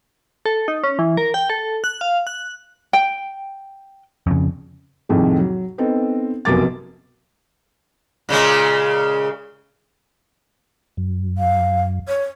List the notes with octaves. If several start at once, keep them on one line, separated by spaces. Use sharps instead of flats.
A4
D#4
C#4
E3
A#4
G5
A4
F#6
F5
F#6
G5
F2 C#3
C2 F2 A2 D#3 G#3
F#3
B3 C4 D#4 A4
F1 B1 F#2 A#4 D6 A6
A#2 C#3 G#3
F#2
F5
C#5